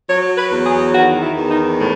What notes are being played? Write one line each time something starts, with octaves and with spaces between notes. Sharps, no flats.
F#3 C#5
B4
E2
G#4
D#3 F#4
E4
E2
D#4
A2